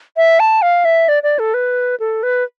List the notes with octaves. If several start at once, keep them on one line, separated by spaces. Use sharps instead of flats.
E5
A5
F5
E5
D5
D5
A4
B4
A4
B4